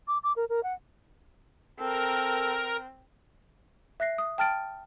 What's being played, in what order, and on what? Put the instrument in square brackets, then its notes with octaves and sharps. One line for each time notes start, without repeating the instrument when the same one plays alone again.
[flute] D6
D6
A#4
A#4
F#5
[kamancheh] C4 [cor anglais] A4 [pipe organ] A#4
[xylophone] E5 F#6 A#6 C7
D#6
G5 A5 F6 A6 D7